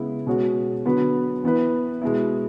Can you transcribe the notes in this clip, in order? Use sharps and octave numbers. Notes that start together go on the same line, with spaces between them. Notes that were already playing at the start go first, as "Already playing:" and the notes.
Already playing: C#3 G#3 B3 E4
B2 G#3 C#4 F#4
D3 F#3 B3 F#4 B4
E3 B3 E4 B4
B2 G#3 B3 E4